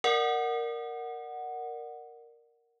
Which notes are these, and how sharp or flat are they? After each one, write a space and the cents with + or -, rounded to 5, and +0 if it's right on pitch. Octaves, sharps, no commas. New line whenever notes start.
A#4 +0 D5 +25 F#5 +0